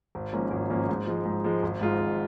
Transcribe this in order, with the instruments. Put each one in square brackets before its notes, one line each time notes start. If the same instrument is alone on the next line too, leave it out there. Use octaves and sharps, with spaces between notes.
[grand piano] G#1
G#2 F3 A#3 C#4
G#1
G#2 F3 A#3 C#4
G#2
F3 G#3
G#2
F3 G#3
G#1
G#2 G#3 F4
G#1